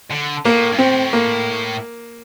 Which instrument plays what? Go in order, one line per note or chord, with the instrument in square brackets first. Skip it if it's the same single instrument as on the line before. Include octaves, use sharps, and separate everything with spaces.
[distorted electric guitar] D3
[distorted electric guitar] A2 [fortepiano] A#3
[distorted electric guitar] G2
[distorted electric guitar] A2 [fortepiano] C4
[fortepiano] A#3